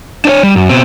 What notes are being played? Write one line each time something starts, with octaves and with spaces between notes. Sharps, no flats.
D4 C5 C#5
G3
F#2
B2 C4